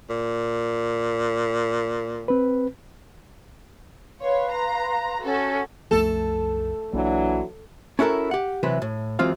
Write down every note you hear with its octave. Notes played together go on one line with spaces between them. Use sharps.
A#2
C4 B4
B4 C#5 F5 C6
A#5
C#4 F#4 A4
C2 F#2 F3 A3 A4
B1 E3 F#3 A#3 D4
C#4 E4 F#4 A4 A#4
G4 F#5
C3 E3 F#3 B4
A2
F#2 E3 G#3 C4 F4 F5